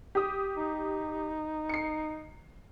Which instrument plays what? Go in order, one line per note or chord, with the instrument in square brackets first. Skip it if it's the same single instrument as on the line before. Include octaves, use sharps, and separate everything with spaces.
[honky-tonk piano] G4 D#6
[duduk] D#4
[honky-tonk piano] C7 C#7